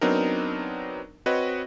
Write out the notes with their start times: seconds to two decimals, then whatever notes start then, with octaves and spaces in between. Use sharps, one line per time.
0.01 F#3 B3 C4 D4 D#4 A#4
1.26 C4 F#4 B4 C#5 D#5